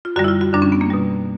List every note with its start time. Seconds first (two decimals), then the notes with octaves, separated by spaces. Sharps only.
0.05 F4
0.16 F#2 D3 G3 F#4
0.24 E4
0.28 F4
0.41 F#4
0.53 F#2 D3 G3 D4
0.62 C#4
0.72 B3
0.81 A#3
0.91 B2 G3